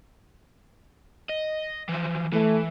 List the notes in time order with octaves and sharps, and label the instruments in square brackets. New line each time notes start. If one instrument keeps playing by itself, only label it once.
[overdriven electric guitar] D#5
E3 F3
[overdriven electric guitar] E3 [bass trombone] A3